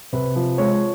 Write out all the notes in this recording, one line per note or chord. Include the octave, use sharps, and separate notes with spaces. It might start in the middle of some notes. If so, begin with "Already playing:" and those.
C3 B4
F3
G#3 C#5